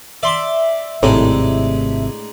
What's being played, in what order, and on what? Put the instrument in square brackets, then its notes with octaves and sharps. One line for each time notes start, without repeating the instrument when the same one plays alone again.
[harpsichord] D5 C6 D6 [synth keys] E5
[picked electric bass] G#1 C3 [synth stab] A2 [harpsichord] G#3 D4 D#4